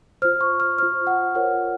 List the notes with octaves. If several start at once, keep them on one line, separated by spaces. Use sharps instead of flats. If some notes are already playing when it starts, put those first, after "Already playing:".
F4 C5 F6
C#6
F6
F4 C5 F6
F#5
F4 A#4 C#5 F#5